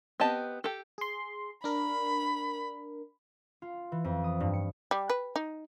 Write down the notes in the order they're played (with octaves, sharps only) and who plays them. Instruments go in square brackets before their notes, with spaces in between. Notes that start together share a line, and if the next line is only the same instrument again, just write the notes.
[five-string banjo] B3 C4 G4 D#5 A5
G4 A4
[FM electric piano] G#4 C6
[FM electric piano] D4 A#4 [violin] B5
[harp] F4
E3
F2
D#6
G2
C#7
[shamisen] G3
B4
D#4